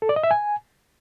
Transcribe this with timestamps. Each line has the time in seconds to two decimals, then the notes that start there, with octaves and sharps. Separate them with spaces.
0.02 A4
0.09 D5
0.16 D#5
0.24 E5
0.31 G#5